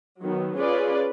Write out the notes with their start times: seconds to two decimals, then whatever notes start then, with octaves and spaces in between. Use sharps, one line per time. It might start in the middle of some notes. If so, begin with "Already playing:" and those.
0.21 D#3 F#3 B3
0.57 C#4 F4 G#4 B4 D5